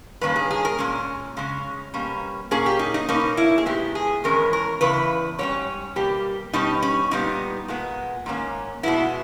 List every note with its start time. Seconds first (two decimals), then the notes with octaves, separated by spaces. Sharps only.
0.21 G2 D#3 A#3 C#4 B4
0.36 G#4
0.51 G#4
0.65 A#4
0.78 A#2 G#3 C#4
1.37 C#3 G#3 C#4
1.94 B2 G3 A#3 C#4
2.51 A#2 A#3 C#4 G#4
2.66 G4
2.79 D#4
2.94 D#4
3.09 B2 A#3 C#4 D#4
3.37 E4
3.58 G#4
3.66 A#2 G#3 B3 G4
3.95 G#4
4.24 E2 D#3 G#3 C#4 A#4
4.53 A#4
4.81 E2 C#3 B4
5.39 G#2 G3 C#4 C#5
5.96 B2 G3 A#3 G4
6.53 B2 G3 C#4 D#4
6.82 C#4
7.11 A#2 G3 B3 D#4
7.68 A#2 G#3 B3
8.26 G#2 D#3 A#3 C#4
8.83 B2 G#3 B3 E4